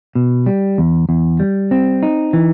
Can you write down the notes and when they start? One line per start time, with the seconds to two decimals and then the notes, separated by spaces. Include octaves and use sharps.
0.15 B2
0.46 G3
0.78 E2
1.09 E2
1.40 G3
1.71 C4
2.03 D#4
2.33 E3